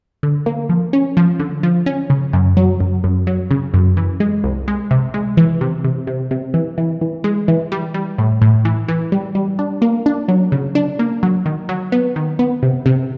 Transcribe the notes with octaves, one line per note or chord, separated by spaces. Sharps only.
D3
A#3
F3
C#4
F3
D3
F3
C#4
C#3
F#2
F#3
F#2
F#2
F#3
C#3
F#2
E3
G#3
C2
G#3
C3
G#3
E3
C3
C3
C3
C3
E3
E3
E3
G#3
E3
G3
G3
A2
A2
E3
E3
G3
G3
D4
A#3
D4
F#3
C#3
D4
A#3
F#3
D#3
F#3
B3
D#3
B3
C3
C3